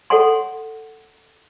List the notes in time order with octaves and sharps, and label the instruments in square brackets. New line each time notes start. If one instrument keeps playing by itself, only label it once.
[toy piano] A4 C#5 F#5 G#5 C6